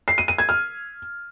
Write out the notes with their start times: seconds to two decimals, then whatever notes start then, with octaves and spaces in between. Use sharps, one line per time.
0.08 C7
0.18 D#7
0.28 D#7
0.38 G#6
0.49 F6